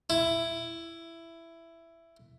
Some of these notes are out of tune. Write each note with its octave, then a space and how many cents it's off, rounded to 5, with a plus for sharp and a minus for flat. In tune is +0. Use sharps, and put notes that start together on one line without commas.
E4 +10